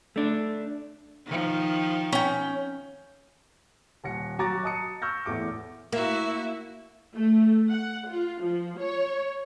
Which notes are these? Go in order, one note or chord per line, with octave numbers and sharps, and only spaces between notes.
A3 D4
D#3 F3
C#4 G5
D#1 F#5 A#6 C#7
F#3 F#4 A#5 D6 A6
D#5 A5 D#6 C#7
C#6 E6 F6 G6 A#6
E2 A2 A3 D6 C#7
A#3 E4 F#4 E5
A3
F#5
F4
F3
C#5